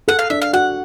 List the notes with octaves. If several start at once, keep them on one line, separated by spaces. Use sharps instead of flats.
A4 F#5
F5
D4 E5
F5
F#4 F#5